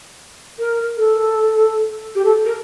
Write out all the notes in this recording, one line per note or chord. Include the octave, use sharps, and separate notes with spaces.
A#4
A4
G4
A4
A#4